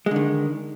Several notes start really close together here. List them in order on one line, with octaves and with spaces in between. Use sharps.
G#3 D3 D#3